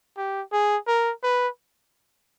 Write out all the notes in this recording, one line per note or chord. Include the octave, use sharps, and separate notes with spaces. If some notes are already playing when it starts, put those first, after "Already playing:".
G4
G#4
A#4
B4